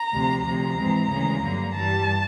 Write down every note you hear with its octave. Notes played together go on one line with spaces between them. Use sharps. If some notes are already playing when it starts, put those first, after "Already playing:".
Already playing: A#5
D2 C3 F3
D2 C3 F3 A#5
G#2 E3 G#3 C4
D2 C#3 E3 G#3
G2 D3 F#3 A#3
G2 E3 G3 A5